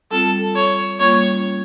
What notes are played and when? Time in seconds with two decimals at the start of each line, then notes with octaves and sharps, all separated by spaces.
0.11 G3 C4 F4 A4
0.55 C#5
1.00 G3 A#3 C#4 F4 C#5